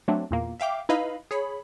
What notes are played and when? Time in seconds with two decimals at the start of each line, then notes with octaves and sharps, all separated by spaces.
0.08 F#3 A3 C4 D4
0.31 E2 A#2 A#3
0.60 E5 F5 G5 D6
0.89 D#4 E4 B4 D#5 F5 B5
1.31 G#4 C#5 B5